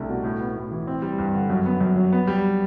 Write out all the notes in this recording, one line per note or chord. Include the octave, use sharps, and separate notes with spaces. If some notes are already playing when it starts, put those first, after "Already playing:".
Already playing: C2 G3 A3 D4
B2
A2
B3
A2
E3
C4
G3
G2
D3
F#2
B3
F#2
F#3
B3
G3